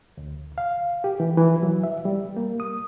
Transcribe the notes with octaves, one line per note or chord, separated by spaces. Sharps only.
D2
F5
G4
E3
E3
F#3
E5
G3
A#3
D#6